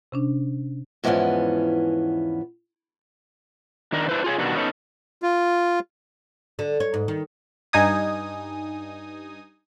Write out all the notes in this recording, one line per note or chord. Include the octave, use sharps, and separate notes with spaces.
C3 C#4 D4
E2 G#2 E3 F3 B3 C#4
D#3 D4 A#4
D4 E4 B4 C5
F4 G#4 C#5
B2 D#3 G3 D4 F#4
B3 C#4 D#4 A4
F4
D3
C#5
G#2
D#3
G2 D#4 G#5 D#6